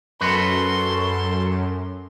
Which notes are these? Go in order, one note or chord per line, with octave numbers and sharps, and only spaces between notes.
F#2 F#4 A4 B4 C6